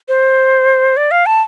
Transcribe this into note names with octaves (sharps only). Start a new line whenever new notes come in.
C5
D5
F5
A5